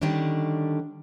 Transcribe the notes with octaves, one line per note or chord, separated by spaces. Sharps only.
D3 D#3 G3 C#4 D4